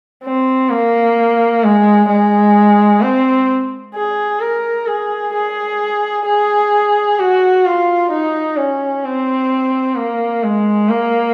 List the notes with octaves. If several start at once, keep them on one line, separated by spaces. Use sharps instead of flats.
C4
A#3
G#3
G#3
C4
G#4
A#4
G#4
G#4
G#4
F#4
F4
D#4
C#4
C4
A#3
G#3
A#3